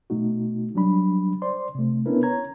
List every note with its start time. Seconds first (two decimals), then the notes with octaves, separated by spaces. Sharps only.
0.10 B2 A3 D#4 F#4
0.75 F#3 G3 D4 B5
1.42 C5 D5 C6
1.75 C3 A3
2.06 B3 C#4 D4 E4 A#4 B4
2.23 C#5 A#5 G#6